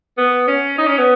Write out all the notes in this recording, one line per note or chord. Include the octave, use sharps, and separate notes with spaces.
B3
C#4
D#4
C#4
B3